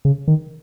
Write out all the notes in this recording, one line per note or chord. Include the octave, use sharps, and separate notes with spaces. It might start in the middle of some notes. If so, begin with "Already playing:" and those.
C#3
D#3